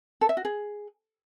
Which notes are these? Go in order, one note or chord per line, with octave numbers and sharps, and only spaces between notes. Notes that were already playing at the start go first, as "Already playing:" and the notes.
A4
E5
F#4
G#4